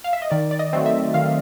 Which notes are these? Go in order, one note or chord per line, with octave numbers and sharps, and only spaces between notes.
F5
E5
D#5
D#3 D5
D5
D#5
F#3 A3 C4
E5
D#3 F5